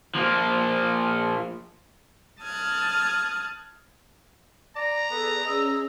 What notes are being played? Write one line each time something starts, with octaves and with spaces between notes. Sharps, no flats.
F3 A#3
A5 D#6 F6 F#6 G#6
D5 A#5 A#6
B3 G#4 A4 B4 D5
C#4 G#4 D#5 E6